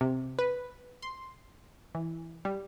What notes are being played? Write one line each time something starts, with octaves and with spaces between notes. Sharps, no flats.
C3
B4
C6
E3
G3